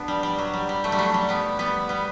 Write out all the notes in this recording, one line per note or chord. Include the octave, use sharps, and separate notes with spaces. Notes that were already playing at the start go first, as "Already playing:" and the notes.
Already playing: B3 D4
G3
G3
F#3
G3
G3
F#3 A3
G3
F#3 A3
G3
G3 B3
G3 B3
G3 B3